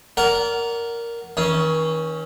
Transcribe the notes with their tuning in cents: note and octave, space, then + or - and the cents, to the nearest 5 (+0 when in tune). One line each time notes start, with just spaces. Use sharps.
A#4 +0 D5 -30 F#5 +0
D#3 +45 C#4 +0